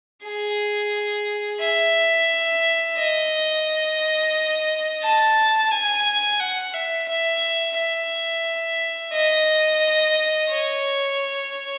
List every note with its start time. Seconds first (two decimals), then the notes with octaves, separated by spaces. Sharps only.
0.24 G#4
1.61 E5
2.98 D#5
5.03 A5
5.71 G#5
6.40 F#5
6.74 E5
7.08 E5
7.76 E5
9.13 D#5
10.50 C#5